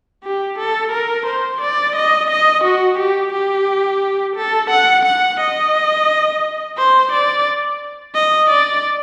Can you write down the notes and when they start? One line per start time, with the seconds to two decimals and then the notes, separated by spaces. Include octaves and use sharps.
0.24 G4
0.59 A4
0.92 A#4
1.27 C5
1.61 D5
1.96 D#5
2.31 D#5
2.64 F#4
2.99 G4
3.33 G4
4.36 A4
4.71 F#5
5.06 F#5
5.41 D#5
6.78 C5
7.13 D5
8.15 D#5
8.50 D5